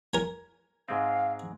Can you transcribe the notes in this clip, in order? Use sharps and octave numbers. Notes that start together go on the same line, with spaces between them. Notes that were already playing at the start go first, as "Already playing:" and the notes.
A#4 G#5
G#2 G#3 C4 F5